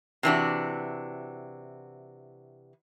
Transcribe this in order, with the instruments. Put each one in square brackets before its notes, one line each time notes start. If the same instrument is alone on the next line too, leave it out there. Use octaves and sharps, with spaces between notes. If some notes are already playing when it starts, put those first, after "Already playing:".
[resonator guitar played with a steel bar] C3 E3 D4 F#4